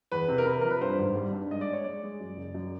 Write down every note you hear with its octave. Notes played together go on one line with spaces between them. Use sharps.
E2 B4
C3
A#4
C3 B4
F3 A#4
B4
G2 C5
G#1
G3
G2
G#3 D#5
D5
G#3
C#5
G#3 D5
G#3
F#2
F#1
F#2